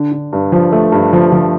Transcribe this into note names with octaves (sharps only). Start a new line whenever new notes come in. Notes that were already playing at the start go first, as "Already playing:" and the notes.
Already playing: D3
D3
G2
F3
A3
G2
F3
F3